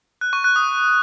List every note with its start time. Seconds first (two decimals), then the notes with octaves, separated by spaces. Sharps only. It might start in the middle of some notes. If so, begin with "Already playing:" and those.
0.21 F#6
0.33 C#6
0.44 F#6
0.56 D#6